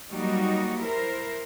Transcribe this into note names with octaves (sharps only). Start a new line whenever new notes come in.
F#3 G3 A#3 D#4 F#4
E4 A#4 C5